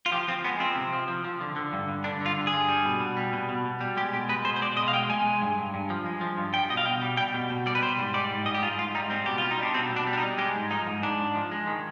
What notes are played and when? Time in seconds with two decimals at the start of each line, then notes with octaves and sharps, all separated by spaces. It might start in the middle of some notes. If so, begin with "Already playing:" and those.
0.06 F4
0.12 F3 G4
0.28 F3 C4
0.44 G#3 B3
0.60 F3 C4
0.76 C3
0.93 F3
1.08 F3
1.25 F3
1.41 D3
1.56 D3
1.73 G2
1.89 G2
2.04 D3 D4
2.21 D3 F4
2.37 G2
2.47 G#4
2.53 G2
2.69 G3
2.85 B2
3.00 B2
3.17 G3
3.33 B2
3.49 B2
3.65 B2
3.81 G3
3.97 G#3 G4
4.13 B2 G4
4.29 G#3 B4
4.45 B2 C5
4.56 C5
4.62 G#3 D5
4.77 B2 D#5
4.88 F5
4.93 G#3 G5
5.10 G#3 G#5
5.25 G#3
5.41 G2
5.58 G2
5.74 G2
5.90 F3
6.06 G#3
6.21 F3
6.38 G2
6.53 G3 G5
6.70 B2 D#5
6.77 F5
6.85 B2 G5
7.02 G3
7.17 G3 G5
7.34 B2
7.50 B2
7.66 G3 D5
7.75 B4
7.82 G3 C5
7.99 G#2
8.14 G3 D5
8.31 G#2
8.45 G#2 D#5
8.54 G4
8.62 G#2 F4
8.78 G#2 F4
8.95 G3 D#4
9.10 G3 C4
9.26 B2 G4
9.38 G3 F4
9.51 D#4
9.59 G3 D4
9.74 B2 C4
9.91 B2
9.96 D4
10.07 G3
10.13 D4
10.18 D#4
10.23 G3
10.38 G#3 G4
10.55 G#2
10.70 F3 D#4
10.87 G#2
11.03 G#2 D4
11.19 G#2
11.35 F3
11.52 G#3
11.67 D#3